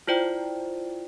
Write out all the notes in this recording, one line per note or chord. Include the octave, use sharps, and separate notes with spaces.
E4 F4 C5 D5 G5